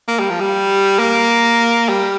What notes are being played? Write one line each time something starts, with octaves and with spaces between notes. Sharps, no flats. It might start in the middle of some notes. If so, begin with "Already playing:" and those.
A#3
G3
F3
G3
A#3
G3